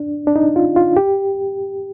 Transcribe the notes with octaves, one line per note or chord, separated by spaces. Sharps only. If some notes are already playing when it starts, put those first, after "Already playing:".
Already playing: D4
D4
D#4
F4
F4
G4